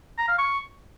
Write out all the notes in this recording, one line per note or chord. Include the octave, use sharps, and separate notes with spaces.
A#5
F5
C#6